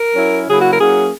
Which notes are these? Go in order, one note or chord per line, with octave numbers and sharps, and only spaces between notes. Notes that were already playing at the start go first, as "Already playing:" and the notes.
Already playing: A#4
F#3 C#4 E4
C#3 F#3 A#3 E4 G#4
F#4
A#4
F#3 A#3 C#4 E4 G#4